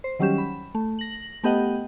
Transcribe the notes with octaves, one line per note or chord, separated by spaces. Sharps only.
C5
D#3 F#3 G3 C#4 G4 E7
B5
A3
A#6 F#7
A3 B3 G4 D#5 F#5 G5